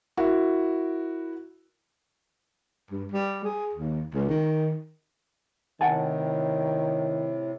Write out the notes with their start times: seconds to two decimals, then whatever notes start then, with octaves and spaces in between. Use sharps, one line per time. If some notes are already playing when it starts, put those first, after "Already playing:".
0.17 E4 F#4 A#4
2.90 G2
3.12 G3
3.44 G#4
3.73 D#2
4.14 C#2
4.29 D#3
5.81 A2 C3 D#3 F#5 G#5 A5